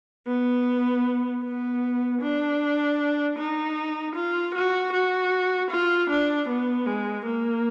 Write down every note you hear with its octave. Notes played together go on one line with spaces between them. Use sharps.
B3
B3
D4
D#4
F4
F#4
F#4
F4
D4
B3
G#3
A#3